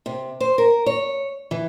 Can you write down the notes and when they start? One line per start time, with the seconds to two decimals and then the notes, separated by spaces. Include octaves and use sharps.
0.06 C3
0.40 C5
0.58 A#4
0.86 C#5
1.51 E3